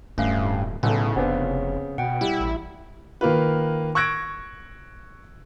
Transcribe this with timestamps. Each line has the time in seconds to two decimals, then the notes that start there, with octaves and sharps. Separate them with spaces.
0.18 D1 G2 A3 C#4 F5
0.83 B1 A2 C#3 C#4 A4
1.16 F1 B3 C4 D4
1.98 B2 F#5 G5
2.21 G3 E4
2.40 A1
3.21 D#3 A#3 F4 B4
3.95 C#6 E6 F#6 G#6 A#6 D7